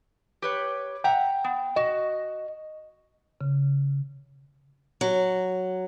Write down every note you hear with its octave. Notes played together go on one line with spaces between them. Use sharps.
G4 B4 C#5
E5 F#5 G5 A#5
B3
F#4 D#5
C#3
F#3